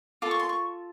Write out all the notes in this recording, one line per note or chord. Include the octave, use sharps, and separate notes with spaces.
F4 A4 D6
C#6
C6
C#6